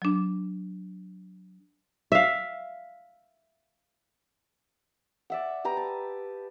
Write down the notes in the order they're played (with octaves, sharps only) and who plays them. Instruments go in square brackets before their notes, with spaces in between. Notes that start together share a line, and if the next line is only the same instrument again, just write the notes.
[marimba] F#3 D4
[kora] E5 F5
[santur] D5 E5 F#5
G4 B4 A#5 D#6
A5